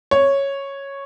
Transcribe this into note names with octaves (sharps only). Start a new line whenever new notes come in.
C#5